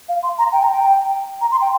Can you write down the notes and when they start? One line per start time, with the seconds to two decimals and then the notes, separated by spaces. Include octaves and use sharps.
0.09 F5
0.23 C6
0.38 A#5
0.53 G5
0.63 A#5
0.72 G5
1.41 A#5
1.51 C6
1.61 G5